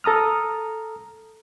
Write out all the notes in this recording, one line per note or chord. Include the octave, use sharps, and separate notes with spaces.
A4 A#5 D#6 F6